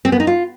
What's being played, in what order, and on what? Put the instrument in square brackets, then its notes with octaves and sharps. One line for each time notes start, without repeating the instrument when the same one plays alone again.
[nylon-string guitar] C4
B3
D#4
F4